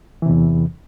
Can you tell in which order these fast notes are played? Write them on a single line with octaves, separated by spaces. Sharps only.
E3 C3 E2